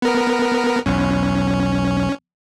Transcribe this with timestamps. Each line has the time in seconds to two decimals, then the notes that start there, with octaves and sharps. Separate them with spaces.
0.02 B3 A#4
0.86 B1 E2 C#4